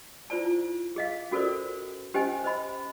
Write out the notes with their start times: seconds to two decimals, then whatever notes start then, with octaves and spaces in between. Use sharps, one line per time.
0.30 E4 F4 C5 D5 A5
0.96 G#4 D#5 F5
1.31 C#4 F#4 A4 A#4 C5 D5
2.14 C#4 G4 C5 D#5 G5 G#5
2.44 C5 D#5 B5